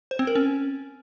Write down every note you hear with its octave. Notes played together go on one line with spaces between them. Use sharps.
C5
C4
A#4
C#4